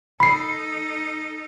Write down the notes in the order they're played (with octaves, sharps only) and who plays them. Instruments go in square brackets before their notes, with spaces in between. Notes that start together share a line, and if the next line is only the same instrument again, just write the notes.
[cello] D#4 A4 [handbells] B5 C7